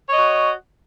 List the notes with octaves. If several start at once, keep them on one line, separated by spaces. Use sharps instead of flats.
F#4 C#5 D#5